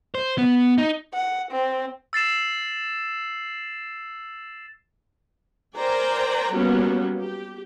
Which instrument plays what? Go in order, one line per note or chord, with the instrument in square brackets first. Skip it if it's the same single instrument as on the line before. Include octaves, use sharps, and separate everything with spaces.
[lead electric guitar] C5
B3
D#4
[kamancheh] F#5
C4
[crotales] E6 A6 C7 E7
[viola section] A#4 C5 D5 G5 G#5 A#5
F#3 G3 A#3 B3 C#4 G4
G4